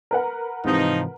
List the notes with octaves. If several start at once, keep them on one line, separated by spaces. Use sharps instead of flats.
A#4 B4 F#5
G#2 C3 E3 F3 D#4